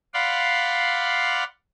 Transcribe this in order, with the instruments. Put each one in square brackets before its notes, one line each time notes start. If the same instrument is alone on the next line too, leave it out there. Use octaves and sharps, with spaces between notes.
[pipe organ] D5 F5 F#5 B5 C6